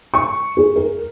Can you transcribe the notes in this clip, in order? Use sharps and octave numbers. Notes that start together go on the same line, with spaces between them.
C#6
G#4
A#4